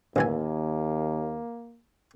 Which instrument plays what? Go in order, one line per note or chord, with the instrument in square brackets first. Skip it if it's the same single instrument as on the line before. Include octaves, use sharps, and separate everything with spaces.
[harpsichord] A1 E3 G#5 [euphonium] D#2 [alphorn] A#3